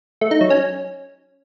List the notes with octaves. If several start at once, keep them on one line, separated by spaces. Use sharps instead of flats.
A3
D#4
F#3
C#4